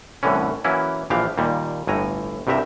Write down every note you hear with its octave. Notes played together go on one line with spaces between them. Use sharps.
C2 A2 D3 E3 C#4
E3 F#3 A#3 C#4 E4
A#1 E3 F3 G4 F5
D#2 A#2 G3
G1 A2 G#5 A#5
C2 G2 C3 G4 E5 A#5